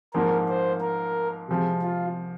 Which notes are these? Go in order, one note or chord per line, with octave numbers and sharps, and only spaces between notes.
G#2 F3 A#3 A#4
C5
A#4
C3 F3 G#3
F4